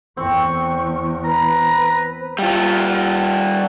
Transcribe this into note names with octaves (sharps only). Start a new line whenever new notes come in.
E2 C4 C#6
B4 A#5
G3 F4